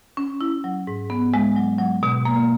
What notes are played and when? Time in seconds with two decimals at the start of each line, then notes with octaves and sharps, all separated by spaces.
0.17 C#4
0.41 E4
0.64 F#3
0.87 G#2
1.10 B3
1.34 G#3
1.57 F#3
1.79 F#3
2.03 B2
2.25 A#3